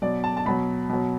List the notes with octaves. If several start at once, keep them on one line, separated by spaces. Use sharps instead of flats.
B2 F#3 D5
A5
A5
B2 F#3 B5
B2 F#3